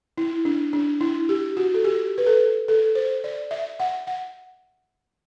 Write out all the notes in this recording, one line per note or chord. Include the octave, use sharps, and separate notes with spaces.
E4
D4
D4
E4
G4
F#4
A4
G4
B4
A4
A4
C5
D5
E5
F#5
F#5